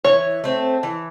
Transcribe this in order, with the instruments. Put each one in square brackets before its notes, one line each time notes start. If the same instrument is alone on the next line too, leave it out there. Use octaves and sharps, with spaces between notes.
[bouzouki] E3 [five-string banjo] C#5
[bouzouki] A3 C4
E3